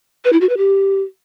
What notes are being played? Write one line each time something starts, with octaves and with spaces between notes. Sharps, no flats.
B4
E4
F#4
B4
G4